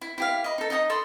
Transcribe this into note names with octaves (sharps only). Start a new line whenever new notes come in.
E4
E4 G4 F5
D#5 B5
D#4 A4
D#4 D#5 G#5 D#6
A4 B5 C6 D#6